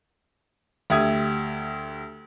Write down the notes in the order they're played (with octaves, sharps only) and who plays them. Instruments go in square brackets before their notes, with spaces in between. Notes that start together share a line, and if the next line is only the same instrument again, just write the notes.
[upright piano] D2 G4 E5 D#6 G#6